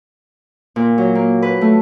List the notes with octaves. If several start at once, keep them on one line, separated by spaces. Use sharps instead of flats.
A#2
F#3
A#3
B4
A3